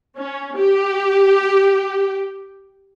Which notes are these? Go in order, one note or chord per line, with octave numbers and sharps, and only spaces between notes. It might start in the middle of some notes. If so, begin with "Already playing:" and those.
C#4
G4